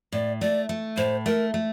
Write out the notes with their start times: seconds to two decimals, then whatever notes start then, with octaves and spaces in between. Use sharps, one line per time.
0.12 A2 D5
0.41 A3 D5
0.69 A3
0.97 A2 C5
1.26 A3 A#4
1.54 A3